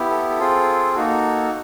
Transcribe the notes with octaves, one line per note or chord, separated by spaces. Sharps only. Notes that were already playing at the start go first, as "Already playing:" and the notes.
Already playing: B3 E4 G4
A4
A4
C4 F4 G#4
A#3 D#4 F#4 A4